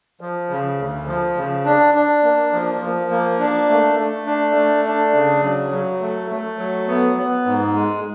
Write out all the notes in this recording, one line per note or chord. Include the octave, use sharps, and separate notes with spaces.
F3
C#3
D2
F3
C#3
D4
D4
A#3
F3
F3
A#3
D4
A3
A3
D4
A3
D4
C#3
F#3
F#3
A3
A3
F#3
B3
B3
G#2
G#3